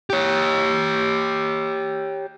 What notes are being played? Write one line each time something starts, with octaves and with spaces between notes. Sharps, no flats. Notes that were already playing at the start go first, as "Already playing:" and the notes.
G4 C#5